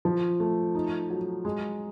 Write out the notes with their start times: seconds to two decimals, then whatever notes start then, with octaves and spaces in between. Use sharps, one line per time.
0.05 F3
0.40 A3
0.75 D#4
1.10 F#3
1.45 G#3